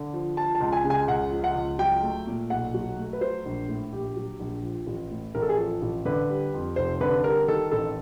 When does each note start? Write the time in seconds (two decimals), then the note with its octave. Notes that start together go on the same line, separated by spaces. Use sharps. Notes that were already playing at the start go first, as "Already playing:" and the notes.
Already playing: D3
0.13 F3
0.37 F3 A5
0.55 A5
0.60 C#2
0.72 G#5
0.85 C#3
0.90 G#5
1.08 C#2 F#5
1.32 F3
1.44 F#5
1.56 C#2
1.79 F#3 G5
2.03 A3
2.27 A#2
2.50 B1 F#5
2.74 F#3
2.97 A3
3.13 B4
3.21 F#3 C5
3.45 A#1
3.68 A2
3.92 A#1 G4
4.16 F#3
4.40 A#1
4.63 F3
4.87 A1
5.11 A2
5.35 A1 A#4
5.42 A4
5.49 G#4
5.56 F3 A4
5.82 A1
6.05 D3 B4
6.29 G3
6.54 F2
6.76 F1 C5
7.01 D3 B4
7.24 G3 A#4
7.48 D#3 A4
7.71 A1 A4